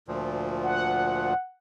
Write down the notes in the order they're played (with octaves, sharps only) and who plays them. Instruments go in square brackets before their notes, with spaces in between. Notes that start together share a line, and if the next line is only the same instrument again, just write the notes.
[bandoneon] D2 A#2 F3
[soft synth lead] F#5